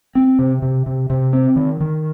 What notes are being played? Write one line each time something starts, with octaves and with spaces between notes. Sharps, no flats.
C4
C3
C3
C3
C3
C4
D#3
D#3